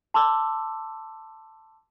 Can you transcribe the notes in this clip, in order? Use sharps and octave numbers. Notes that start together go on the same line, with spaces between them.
A5 C6 D6 E6